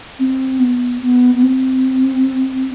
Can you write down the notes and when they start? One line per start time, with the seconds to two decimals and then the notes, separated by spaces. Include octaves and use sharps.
0.19 C4
0.59 B3
1.02 B3
1.35 B3
1.43 C4